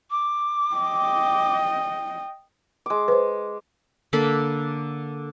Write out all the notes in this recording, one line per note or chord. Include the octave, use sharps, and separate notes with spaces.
D6
D#5 G5
G#3 D6
B4 C5
D3 A#3 A4 B5